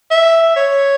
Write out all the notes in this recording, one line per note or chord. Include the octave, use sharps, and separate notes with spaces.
E5
C#5